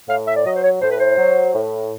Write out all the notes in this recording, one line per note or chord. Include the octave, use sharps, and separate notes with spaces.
A2 F5
E5
D5
F#3 D#5
C5
C#5
A2 C5
B4
C5
F#3
A2